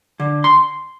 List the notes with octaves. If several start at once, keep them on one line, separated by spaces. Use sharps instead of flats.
D3
C6